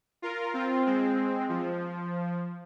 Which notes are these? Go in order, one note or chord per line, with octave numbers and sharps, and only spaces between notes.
F4 A#4
C4 F4
G#3 C4
F3